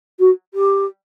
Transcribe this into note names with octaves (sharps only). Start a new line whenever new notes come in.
F#4
G4